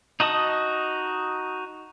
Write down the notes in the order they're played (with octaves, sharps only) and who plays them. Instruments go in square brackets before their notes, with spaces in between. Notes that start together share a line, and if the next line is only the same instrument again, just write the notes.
[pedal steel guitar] D#4 F#4 D#5 A5 D#6